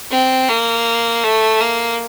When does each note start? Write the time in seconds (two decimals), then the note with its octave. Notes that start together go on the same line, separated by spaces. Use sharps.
0.11 C4
0.49 A#3
1.23 A3
1.60 A#3